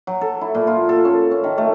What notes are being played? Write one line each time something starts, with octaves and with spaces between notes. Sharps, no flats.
F#3
A4
E4
A#2
F4
A4
C#4
C#4
D#3
A3